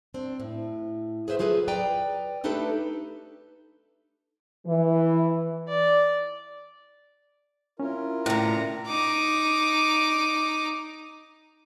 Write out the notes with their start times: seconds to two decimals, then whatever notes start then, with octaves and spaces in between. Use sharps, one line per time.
0.14 C4 D4
0.40 A2
1.28 G#4 B4 C5 E5
1.39 F#3 F4 G#4 A4 B4
1.68 B4 D5 G5 A#5
2.44 A3 D4 D#4 G4 A4 B4
4.66 E3
5.69 D5
7.79 C#4 E4 F4 A#4
8.26 A2 D3 A#5
8.87 D#4 D6